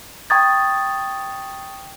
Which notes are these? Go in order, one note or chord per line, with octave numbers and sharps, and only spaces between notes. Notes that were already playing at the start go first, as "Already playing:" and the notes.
G5 A#5 C#6 D#6 G#6 A6